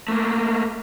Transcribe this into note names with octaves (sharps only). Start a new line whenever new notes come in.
A3 A#3